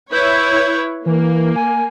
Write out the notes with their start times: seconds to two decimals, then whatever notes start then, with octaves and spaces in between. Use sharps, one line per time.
0.12 E4 B4 C#5 G6
1.06 E3 A#3
1.56 G#5